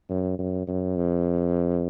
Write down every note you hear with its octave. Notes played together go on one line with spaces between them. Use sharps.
F#2
F#2
F#2
F2